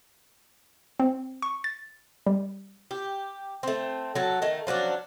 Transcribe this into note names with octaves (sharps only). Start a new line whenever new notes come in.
C4
C#6
A6
G3
G4
A3 C4
F#3 A4
D#3 A3
F3 F#3 C#4 D4